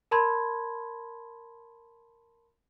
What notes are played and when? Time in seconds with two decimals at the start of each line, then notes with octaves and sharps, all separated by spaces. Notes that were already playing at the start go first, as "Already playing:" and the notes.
0.11 A#4 A5 B5 C6 G#6